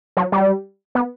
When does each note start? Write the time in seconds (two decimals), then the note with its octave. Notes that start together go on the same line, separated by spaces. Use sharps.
0.17 F#3
0.32 G3
0.95 B3